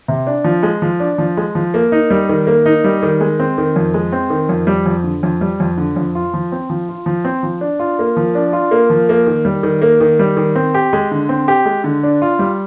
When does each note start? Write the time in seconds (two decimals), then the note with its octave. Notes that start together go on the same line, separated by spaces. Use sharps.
0.08 C3
0.27 D4
0.44 F3
0.63 G#3
0.82 F3
1.00 D4
1.18 F3
1.37 G#3
1.55 F3
1.74 A#3
1.92 D#4
2.10 G3
2.29 D#3
2.47 A#3
2.66 D#4
2.84 G3
3.03 D#3
3.21 G#3
3.40 C4
3.58 D#3
3.76 F2
3.94 G#3
4.12 C4
4.30 D#3
4.49 F2
4.67 G3
4.86 F2
5.04 D3
5.23 F2
5.41 G3
5.60 F2
5.78 D3
5.96 F2
6.15 F4
6.34 F3
6.52 C4
6.70 F3
6.89 F4
7.06 F3
7.25 C4
7.43 F3
7.61 D4
7.79 F4
7.99 A#3
8.17 F3
8.35 D4
8.53 F4
8.71 A#3
8.90 F3
9.09 A#3
9.27 D#3
9.45 G3
9.63 D#3
9.82 A#3
10.00 D#3
10.19 G3
10.37 D#3
10.55 C4
10.74 G4
10.93 G#3
11.11 D3
11.29 C4
11.48 G4
11.65 G#3
11.84 D3
12.03 D4
12.22 F4
12.39 G3